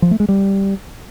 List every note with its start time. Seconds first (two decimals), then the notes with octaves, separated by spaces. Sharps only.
0.02 F3
0.11 A3
0.20 G#3
0.29 G3